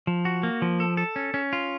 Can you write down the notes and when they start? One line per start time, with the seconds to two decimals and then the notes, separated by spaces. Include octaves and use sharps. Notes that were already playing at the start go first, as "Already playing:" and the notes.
0.07 F3
0.25 F#4
0.43 A#3
0.62 F3
0.80 A4
0.97 A4
1.16 C#4
1.34 C#4
1.53 F4